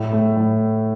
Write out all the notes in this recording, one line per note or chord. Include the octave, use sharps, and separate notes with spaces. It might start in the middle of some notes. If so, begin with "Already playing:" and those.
Already playing: A2
A3
A2